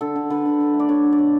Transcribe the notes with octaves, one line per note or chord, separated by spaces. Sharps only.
D3 A4
D3
D3 B4
D3
D3
A3
D5
D3 C#5
D3
D5
B2 C#5